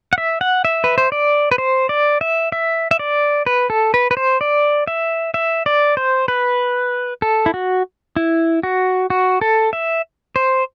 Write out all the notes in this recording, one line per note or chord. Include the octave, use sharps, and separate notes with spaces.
F#5
E5
F#5
E5
B4
C5
D5
B4
C5
D5
E5
E5
E5
D5
B4
A4
B4
B4
C5
D5
E5
E5
D5
C5
B4
A4
E4
F#4
E4
F#4
F#4
A4
E5
C5